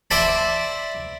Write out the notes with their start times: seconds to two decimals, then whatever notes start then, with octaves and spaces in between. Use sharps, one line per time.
0.11 C5 D5 E5 G5 A5 B5